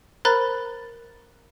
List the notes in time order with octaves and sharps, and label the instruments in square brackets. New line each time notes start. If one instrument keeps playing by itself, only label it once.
[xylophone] A#4 C5 A#5 B5 F#6 A6